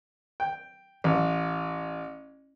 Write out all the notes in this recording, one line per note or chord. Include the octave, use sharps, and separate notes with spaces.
G5
A1